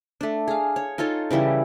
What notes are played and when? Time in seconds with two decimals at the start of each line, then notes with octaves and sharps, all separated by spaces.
0.21 A3 D4
0.48 G#4 F5
0.76 C#5
0.98 D#4 F4 A4 C#5
1.31 C#3 E3 G3 E4